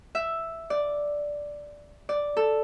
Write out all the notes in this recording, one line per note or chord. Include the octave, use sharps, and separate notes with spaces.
E5
D5
D5
A4